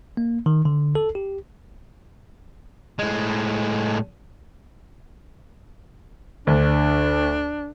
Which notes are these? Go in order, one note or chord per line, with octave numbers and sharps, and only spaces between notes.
A#3
D#3
D3
A4
G4
A2 G#3
D2 D4